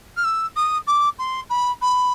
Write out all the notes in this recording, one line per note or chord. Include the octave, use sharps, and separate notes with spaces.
F6
E6
D#6
D6
C6
B5
B5